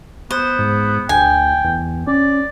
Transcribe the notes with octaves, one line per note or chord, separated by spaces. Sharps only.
B3 C5
G#2
D2 G5 G#5
E2
C#4 D5